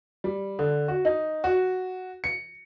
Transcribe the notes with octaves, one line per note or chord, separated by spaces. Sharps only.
G3
D3
F#4
D#4
F#4
C#7